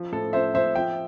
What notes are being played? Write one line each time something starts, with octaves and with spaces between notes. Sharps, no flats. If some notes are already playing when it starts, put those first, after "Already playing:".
Already playing: F3
A2 A4
F3 C5 E5
F3 C5 E5
F3 E5 G5